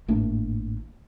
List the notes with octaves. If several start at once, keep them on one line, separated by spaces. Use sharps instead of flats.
G#1 A2 A#3 D4